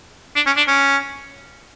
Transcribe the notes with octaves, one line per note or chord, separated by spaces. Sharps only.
D4
C#4
D4
C#4